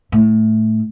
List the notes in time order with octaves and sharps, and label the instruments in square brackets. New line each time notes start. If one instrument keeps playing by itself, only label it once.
[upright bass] A2